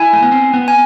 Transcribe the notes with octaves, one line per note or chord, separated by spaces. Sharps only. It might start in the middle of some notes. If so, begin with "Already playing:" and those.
Already playing: E4 G#5
A3
B3
C4
B3
G#5